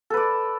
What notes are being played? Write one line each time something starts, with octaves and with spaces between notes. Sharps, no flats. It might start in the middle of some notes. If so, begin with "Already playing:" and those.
A4 B4 D5